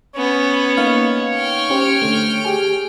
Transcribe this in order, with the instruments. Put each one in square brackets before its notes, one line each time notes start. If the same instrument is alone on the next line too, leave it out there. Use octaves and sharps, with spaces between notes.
[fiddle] B3 C#4 [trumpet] C#5
[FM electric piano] A#3 D#4 F5
[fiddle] G5 F6
[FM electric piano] C#4 G4 C5
D3 A3
G4 G#4 G#5